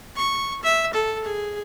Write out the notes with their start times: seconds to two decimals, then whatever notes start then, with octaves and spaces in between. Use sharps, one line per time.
0.16 C#6
0.63 E5
0.94 A4
1.25 G#4